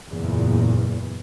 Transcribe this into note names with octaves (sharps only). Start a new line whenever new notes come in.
F#1 E2 A#2